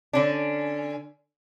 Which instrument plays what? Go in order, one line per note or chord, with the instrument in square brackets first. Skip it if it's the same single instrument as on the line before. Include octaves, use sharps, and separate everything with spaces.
[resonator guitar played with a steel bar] D3 C#4 D4